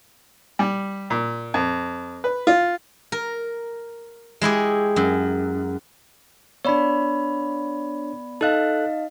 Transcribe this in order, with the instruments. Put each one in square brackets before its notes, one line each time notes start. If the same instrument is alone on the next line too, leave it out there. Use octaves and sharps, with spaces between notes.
[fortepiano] G3
A#2
F2
B4
F4
[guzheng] A#4
G#3 E4 G4 G#4
F#2
[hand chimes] B3 D5 B5 [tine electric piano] D4 C#5
[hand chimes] D#4 D#5 F5 [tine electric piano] A4 F#6